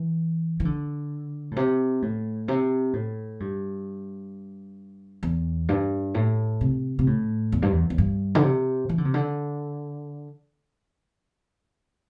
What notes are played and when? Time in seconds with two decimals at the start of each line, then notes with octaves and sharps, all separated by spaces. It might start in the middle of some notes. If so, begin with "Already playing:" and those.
Already playing: E3
0.60 E3
0.65 D3
1.51 A2
1.56 C3
2.02 A2
2.48 C3
2.93 A2
3.40 G2
5.23 E2
5.69 G2
6.14 A2
6.61 C3
6.99 C3
7.07 A2
7.52 E2
7.62 G2
7.72 E2
7.90 E2
7.98 G2
8.35 D3
8.43 C3
8.89 E3
8.98 D3
9.05 C3
9.14 D3